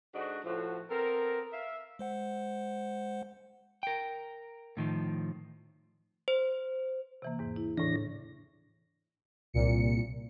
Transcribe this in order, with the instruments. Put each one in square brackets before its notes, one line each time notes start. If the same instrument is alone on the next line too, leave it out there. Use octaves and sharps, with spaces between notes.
[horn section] G#2 D3 D4 F#4
A2 F3 F#4
B3 C4 A4 A#4
E5 F5
[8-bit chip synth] G#3 C5 F#5
[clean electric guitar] A#4 G5
A2 D#3 F3
[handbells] C5
[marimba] C3 E3 A#3
E2 G#2
E4
[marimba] A2 C#3 [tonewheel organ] E3 D4 A#6
[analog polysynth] C2 A#2 C#7